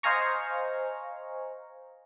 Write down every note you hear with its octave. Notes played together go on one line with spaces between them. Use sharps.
C5 D#5 F5 G#5 A#5 C#6